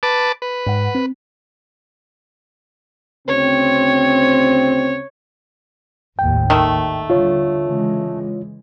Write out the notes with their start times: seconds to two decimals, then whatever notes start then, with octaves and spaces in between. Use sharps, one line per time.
0.03 B4 A5 D6
0.42 B4
0.67 G#2 F#5
0.95 C4
3.28 D2 C#3 C4 C#5
6.19 G#1 D#2 A2 G5
6.50 D#3 A3
7.10 D3 G3 F4 C#5
7.65 C#3 E3 G#3